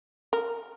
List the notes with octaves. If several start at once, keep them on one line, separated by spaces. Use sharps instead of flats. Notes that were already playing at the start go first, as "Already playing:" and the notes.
A#4